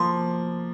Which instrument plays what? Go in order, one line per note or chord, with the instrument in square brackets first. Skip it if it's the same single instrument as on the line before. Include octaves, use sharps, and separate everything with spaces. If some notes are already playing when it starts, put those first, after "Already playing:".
Already playing: [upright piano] F3 A#3 [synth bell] C6